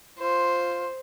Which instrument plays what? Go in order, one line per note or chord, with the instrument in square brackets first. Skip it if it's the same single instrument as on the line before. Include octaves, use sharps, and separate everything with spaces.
[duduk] F4 [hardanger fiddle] C5